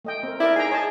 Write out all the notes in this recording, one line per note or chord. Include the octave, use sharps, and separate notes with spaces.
A3 D#5 G5
C4 A#4
E4 A#4 D5
D#4 G#4 G5 A#5
G#4 C#5 D#5 A5